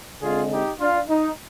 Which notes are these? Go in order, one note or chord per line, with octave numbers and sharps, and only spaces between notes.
D3 G#3 C4 F4 G#4
D#4 G4
D4 F4
D#4